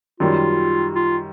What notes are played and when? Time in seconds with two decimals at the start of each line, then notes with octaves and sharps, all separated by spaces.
0.20 F#2 D#3 G3 F4
0.95 F4